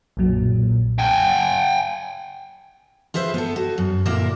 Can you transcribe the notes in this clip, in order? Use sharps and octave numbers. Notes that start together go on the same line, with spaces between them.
B1 F#2 A#2 F#3
G5 G#5
F4 G#4 B4 C5 E5
B3 A4
F#4
F#2
D2 A#2 A#3 E4 A#4 D5